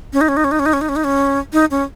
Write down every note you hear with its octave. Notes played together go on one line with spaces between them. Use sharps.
C#4
D#4
C#4
D#4
C#4
D#4
C#4
D#4
C#4
D#4
C#4
D#4
C#4
D#4
C#4